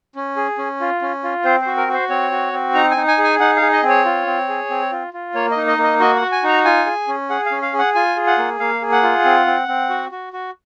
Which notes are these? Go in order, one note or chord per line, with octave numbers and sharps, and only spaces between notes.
C#4
G#4
C#4
F4
C#4
F4
C4 C5
C5
F#4
A#4
F#4 C5
C4 C#5
F#4
C4
D#4 A#5
G#5
D#4
G#5
G#4
G#5
D#4 F#5
F5
G#4
D#5
C4
C#5
F4
C4
G#4
C4
F4
F4
A#3 C#5
D#5
D#4
D#5
A#3
D#5
F#4 D#5
F#5
F#4
G#5
D#4 A#5
F4 G#5
G#4
C#4
G#4 F#5
F5
C#4
F5
G#4
F#5
F4 G#5
G#4
F#5
A#3
A#3 F5
G#4
F#5
F4
C4
C4
C4
F#4
F#4
F#4